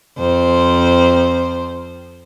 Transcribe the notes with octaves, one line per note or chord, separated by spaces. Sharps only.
F2 C5